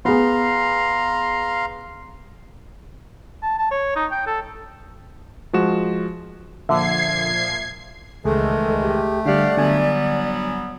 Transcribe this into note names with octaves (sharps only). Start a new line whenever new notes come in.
B3 G#4 F5 A#5 C6
A5
A5
C#5
D#4
G5
A4
F3 G#3 F#4 E7
A#2 D3 F3 E5 G#6 C7
C#2 D#3 E3 G#3 A3 G#4 A4
G4
D3 G3 G4 D5 F5 F#5
D3 F#3 G3 B3 G#5